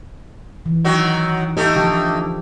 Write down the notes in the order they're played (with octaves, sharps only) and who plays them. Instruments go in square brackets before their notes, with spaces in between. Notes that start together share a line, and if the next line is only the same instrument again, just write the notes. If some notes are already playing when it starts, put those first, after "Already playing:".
[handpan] E3
[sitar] D#3 F#3 F#4
[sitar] A3 A#3 D#4 [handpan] G4
[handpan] D3 F3 G4